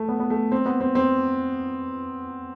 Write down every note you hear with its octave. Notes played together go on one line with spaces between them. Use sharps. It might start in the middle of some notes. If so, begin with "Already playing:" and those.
Already playing: A3
B3
B3
A3
C4
B3
C4
C4